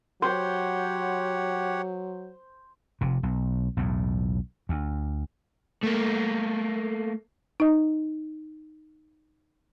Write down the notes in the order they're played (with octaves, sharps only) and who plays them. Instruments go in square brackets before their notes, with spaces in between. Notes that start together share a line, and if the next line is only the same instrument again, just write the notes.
[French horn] F#3 [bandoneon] G4 C#5 F#5 [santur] C5
[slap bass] F1 C3
B1
B1 E2 A2
D2
[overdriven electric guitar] A3 A#3
[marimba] D#4 D#5